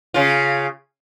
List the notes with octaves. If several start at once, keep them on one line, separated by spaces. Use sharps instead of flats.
C#3 F4